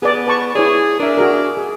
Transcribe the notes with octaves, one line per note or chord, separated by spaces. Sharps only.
B3 G#4 D5
B4 A5 C#6
E4 G#4 C#5 D5
D4 A#4 E5
F#4 G#4 A#4
G#4